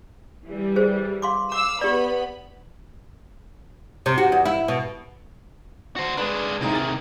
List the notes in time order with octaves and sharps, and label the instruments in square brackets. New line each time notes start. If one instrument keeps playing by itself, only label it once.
[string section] E3 G3
[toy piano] G#4 C5
F5 C6 D6
[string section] F5 E6 [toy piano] D6
[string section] B3 B5 [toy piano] G4 D5
[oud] C3
F#4
E2
E4
B2
[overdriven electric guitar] F#4 C5
[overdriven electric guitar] G#3 D4 [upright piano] B4
[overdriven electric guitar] C3 D#3 [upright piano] G#3 D#4 E4
[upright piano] A6